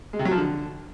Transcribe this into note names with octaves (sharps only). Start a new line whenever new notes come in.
G#3
C3
F#3
F3
D3